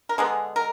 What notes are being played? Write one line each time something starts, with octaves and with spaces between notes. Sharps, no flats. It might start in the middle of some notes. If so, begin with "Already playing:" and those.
A#4
D3 G#3 B3 G#4
A#4